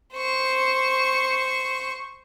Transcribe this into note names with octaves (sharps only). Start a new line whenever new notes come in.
C5 C#6